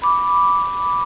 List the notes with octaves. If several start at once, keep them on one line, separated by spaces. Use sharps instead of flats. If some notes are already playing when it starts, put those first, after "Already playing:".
B5 D6